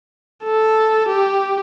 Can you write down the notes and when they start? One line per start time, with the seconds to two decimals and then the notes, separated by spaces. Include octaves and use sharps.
0.43 A4
1.08 G4